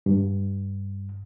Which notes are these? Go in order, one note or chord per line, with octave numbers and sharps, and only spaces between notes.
G2